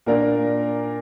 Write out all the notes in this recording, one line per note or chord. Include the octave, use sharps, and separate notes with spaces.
A#2 A#3 D4 A#4 D5